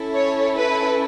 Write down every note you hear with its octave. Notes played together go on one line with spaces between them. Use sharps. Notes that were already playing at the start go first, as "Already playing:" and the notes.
Already playing: C#4 E4 A4
C#5
B4